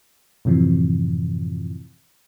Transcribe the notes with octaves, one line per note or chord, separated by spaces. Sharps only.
F#2 A2 C3 E3 F3